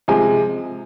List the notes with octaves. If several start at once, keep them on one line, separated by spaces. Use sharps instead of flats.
C3 F3 G#3 G#5